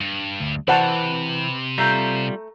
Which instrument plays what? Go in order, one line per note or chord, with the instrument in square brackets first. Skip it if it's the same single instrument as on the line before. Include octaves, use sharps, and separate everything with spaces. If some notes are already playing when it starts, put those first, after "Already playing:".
[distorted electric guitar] G2
[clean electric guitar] D2
[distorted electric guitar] C3 [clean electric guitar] E3 [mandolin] B4 [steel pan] C5 F#5 A5
[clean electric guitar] G3 F4 [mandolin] A3 A#5 G6